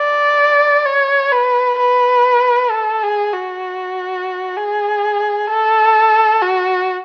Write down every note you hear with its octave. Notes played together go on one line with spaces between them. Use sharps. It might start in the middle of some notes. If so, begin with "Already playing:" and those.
Already playing: D5
C#5
B4
B4
A4
G#4
F#4
G#4
A4
F#4